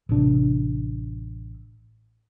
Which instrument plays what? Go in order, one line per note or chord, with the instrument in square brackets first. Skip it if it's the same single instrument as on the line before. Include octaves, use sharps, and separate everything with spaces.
[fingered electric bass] A1 C3 D4